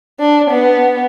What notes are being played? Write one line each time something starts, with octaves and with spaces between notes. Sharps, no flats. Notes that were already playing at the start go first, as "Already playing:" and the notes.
D4
B3